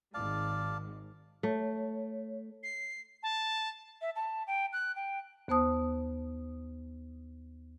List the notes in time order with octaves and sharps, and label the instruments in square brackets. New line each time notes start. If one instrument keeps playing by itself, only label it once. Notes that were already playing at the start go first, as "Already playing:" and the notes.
[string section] G#1 G#2 [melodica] D5 F5 A5
[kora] A3 [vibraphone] C#5
[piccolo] C7
A5
[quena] E5
A5
G5
F#6
G5
[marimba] D#2 B3 C5 A5 D#6